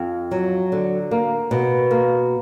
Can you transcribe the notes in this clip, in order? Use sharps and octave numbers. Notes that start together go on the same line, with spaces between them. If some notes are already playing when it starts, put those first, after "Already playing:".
Already playing: F2
F#3
D3
A#3
B2
A#3